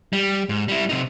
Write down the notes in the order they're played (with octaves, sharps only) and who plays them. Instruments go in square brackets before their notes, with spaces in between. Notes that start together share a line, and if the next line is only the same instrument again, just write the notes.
[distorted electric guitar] G3
G#2
G3 E4
C3 D#4